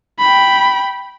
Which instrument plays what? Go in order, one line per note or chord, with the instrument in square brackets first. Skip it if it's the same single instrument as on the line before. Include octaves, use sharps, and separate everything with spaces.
[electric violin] G5 B5